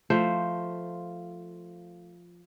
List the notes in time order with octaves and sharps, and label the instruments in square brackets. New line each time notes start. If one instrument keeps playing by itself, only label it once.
[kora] F3 A3 C5